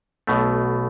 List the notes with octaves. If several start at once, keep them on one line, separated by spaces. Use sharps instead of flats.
B1 B2 A3